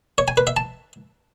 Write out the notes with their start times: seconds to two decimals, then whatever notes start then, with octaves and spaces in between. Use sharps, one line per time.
0.18 C#5
0.28 G#5
0.37 B4
0.47 E5
0.57 A5